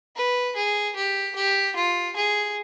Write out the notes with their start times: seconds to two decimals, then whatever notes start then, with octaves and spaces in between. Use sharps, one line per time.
0.16 B4
0.56 G#4
0.96 G4
1.35 G4
1.76 F4
2.16 G#4